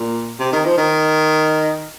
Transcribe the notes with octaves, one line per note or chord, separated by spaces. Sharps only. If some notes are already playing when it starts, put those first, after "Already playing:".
Already playing: A#2
C3
D#3
F3
D#3